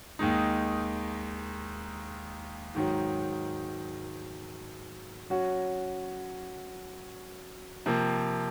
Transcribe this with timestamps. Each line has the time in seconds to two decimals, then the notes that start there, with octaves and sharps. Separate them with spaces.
0.19 D#2 D#3 G#3 D#4
2.75 G#2 D#3 F#3
5.30 F#3 C#4 F#4
7.86 C3 F3 A#3